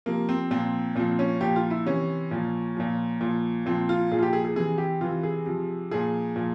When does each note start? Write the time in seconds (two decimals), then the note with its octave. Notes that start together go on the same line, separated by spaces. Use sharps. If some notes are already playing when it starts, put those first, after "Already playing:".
0.06 C3 F3 A#3
0.29 C4
0.51 A#2 F3 C4
0.95 A#2 F3 C4
1.19 C#4
1.41 A#2 F3 G4
1.56 F4
1.70 E4
1.86 C3 E3 C#4
2.31 A#2 F3
2.77 A#2 F3
3.21 A#2 F3
3.66 A#2 F3 C4
3.89 F4
4.11 A#2 F3 G#4
4.19 F4
4.23 G4
4.33 G#4
4.45 G#4
4.56 C3 E3 G#4
4.78 G4
5.01 C3 E3 F4
5.23 G#4
5.46 C3 F3
5.91 A#2 F3 G#4
6.36 A#2 F3